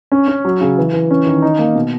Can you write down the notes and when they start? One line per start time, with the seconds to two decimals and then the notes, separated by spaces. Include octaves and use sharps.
0.12 C#4
0.28 C#4
0.45 F#3
0.61 C#3
0.78 E3
0.93 E3
1.11 C#4
1.26 D#3
1.42 D#4
1.59 A#3
1.75 B2